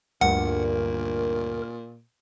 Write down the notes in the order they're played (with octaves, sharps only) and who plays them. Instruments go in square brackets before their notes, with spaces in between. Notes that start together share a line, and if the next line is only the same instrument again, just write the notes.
[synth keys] D2 G2 [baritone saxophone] A#2 [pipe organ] A#4 [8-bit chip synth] F#5